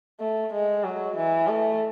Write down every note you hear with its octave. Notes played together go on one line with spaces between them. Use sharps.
A3
G#3
F#3
E3
A3